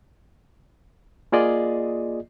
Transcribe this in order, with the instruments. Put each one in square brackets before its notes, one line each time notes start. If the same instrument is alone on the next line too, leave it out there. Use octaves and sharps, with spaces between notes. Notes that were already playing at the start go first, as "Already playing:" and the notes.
[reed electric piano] A#3 F4 G#4 D5 D#5